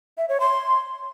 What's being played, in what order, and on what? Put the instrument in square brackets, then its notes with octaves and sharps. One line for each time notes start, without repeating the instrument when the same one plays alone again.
[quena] E5
C#5
C6